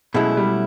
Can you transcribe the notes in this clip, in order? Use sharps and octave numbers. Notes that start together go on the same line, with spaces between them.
B2 F#3 G#3 A3 C#4 E4
G3